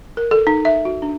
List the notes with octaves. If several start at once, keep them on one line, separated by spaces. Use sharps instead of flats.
A#4
A4
D#4
E5
F#4
D4